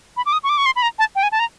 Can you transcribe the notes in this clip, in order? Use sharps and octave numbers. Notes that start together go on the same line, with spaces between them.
B5
D6
D#6
C#6
D6
C#6
C6
B5
A#5
A5
G5
G#5
A5
A#5